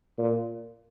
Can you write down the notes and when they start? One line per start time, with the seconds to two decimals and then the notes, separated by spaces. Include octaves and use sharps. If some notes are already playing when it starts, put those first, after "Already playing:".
0.18 A#2